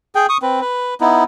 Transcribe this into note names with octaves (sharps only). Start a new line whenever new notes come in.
G#4 G5
C#6 D#6
C4 B4
B4
B3 D#4 E4